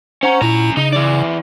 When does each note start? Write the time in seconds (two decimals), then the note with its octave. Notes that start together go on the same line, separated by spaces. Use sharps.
0.23 C#4 C5 F#5 A#5
0.42 A#2 C#4 E4 A#5
0.77 C#3 D#4
0.92 E3 D5